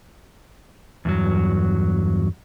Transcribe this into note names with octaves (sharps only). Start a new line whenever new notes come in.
E2 G2 F#3